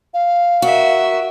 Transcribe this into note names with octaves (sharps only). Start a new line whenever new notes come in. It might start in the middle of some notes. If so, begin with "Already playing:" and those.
F5
F#4 A#4 E5